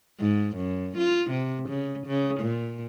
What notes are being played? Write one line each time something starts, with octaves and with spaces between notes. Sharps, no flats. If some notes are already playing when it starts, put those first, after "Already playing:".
G#2
F#2
F4
C3
C#3
C#3
A#2